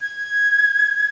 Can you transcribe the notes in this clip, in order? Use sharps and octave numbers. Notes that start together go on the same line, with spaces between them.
G#6